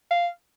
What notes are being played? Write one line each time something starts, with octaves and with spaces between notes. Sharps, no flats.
F5